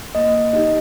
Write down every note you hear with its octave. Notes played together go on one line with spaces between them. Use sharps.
A#3 D#5
D#4 G4 D#5